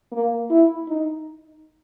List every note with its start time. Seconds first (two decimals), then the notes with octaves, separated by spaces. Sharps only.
0.12 A#3
0.50 E4
0.88 D#4